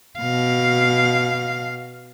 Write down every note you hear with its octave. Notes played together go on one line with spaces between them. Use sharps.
B2 F5